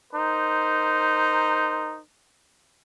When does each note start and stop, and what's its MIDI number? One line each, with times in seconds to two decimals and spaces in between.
0.13 2.00 63
0.13 2.00 70
0.13 2.00 72